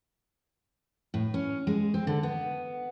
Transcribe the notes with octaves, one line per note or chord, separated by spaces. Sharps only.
A2
C#4
G#3
C4
D3
B3